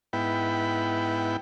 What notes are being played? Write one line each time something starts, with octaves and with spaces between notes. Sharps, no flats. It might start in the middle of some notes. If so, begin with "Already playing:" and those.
G#2 B3 E4 G5 B5